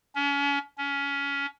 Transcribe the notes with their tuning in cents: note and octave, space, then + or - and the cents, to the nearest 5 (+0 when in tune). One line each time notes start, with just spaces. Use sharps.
C#4 +35
C#4 +20